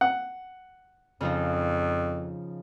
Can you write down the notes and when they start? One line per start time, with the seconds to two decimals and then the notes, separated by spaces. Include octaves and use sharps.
0.01 F#5
1.21 F2 C#3 F3 D#4